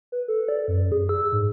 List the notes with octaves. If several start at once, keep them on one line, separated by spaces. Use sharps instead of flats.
B4
A4
D5
F#2
G#4
E6
G#2